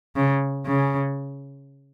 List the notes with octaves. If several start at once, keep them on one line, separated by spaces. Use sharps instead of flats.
C#3
C#3